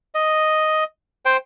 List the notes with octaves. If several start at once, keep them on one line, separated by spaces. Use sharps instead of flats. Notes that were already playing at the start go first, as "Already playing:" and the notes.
D#5
C5 G5